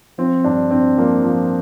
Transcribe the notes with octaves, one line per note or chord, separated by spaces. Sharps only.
F3 C4
G2 D4
G2 C4
F3 A#3
F3